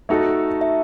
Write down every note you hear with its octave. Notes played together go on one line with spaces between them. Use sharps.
A3 D#4 F#4 A4
E5